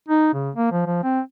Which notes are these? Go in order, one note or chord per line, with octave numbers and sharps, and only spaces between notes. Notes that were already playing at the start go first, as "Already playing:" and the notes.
D#4
C#3
A#3
F3
F3
C4